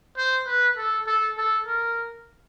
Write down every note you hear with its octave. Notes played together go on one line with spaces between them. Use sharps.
C5
B4
A4
A4
A4
A#4